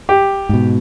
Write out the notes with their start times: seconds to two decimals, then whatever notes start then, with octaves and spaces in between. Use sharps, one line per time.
0.09 G4
0.49 G#2 B2